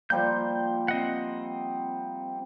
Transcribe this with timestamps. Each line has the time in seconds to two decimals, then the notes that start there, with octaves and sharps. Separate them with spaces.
0.10 F3 G3 A#3 G6
0.88 C4 D#5 F#5